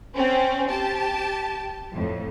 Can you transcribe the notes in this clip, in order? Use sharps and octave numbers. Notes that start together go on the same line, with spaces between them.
C4 C#4
G4 A5
F2 A2